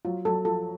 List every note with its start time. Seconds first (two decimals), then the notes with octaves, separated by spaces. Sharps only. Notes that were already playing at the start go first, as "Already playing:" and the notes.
0.05 F#3 F4
0.25 F#3 A4
0.45 F3 A4